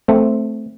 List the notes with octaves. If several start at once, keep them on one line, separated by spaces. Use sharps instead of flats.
A3 C4